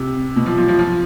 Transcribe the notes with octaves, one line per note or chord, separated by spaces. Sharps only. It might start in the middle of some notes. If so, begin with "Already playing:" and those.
Already playing: C3
B2
F3
F3
F3
F3